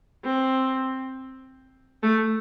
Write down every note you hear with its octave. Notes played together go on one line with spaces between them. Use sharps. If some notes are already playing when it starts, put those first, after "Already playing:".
C4
A3